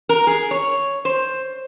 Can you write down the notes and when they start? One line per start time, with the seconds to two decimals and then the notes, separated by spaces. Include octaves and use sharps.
0.09 A#4
0.27 G#4
0.51 C#5
1.05 C5